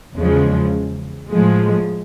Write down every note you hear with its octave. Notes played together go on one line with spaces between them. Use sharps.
E2 C#3 F3 G#3
A2 F3 G#3